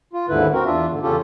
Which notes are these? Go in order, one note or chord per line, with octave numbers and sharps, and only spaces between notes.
F4
D#2 G#2 D3 E4 B4
C4 F#4 A#4
E2 D4 F4 E5
G#2 D3
E2 C#3 C#4 F4 G4 A4